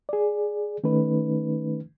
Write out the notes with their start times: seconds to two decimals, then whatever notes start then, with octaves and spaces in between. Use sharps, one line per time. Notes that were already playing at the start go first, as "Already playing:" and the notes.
0.09 G#4 D5
0.84 D#3 A3 C#4 D#4 B4